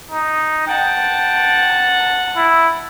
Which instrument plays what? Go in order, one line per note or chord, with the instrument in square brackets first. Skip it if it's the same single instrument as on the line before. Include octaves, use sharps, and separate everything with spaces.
[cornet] D#4
[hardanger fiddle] F#5 A5 [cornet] G5
[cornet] E4